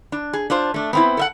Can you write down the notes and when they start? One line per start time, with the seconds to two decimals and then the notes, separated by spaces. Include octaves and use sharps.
0.12 D4
0.33 G#4
0.50 D4 F4 C5
0.74 A3 D4
0.93 B3 C4 E4
1.17 A4 E5 F#5